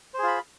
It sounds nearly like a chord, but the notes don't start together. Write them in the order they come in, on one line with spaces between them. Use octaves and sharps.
C5 G#4 F4 B5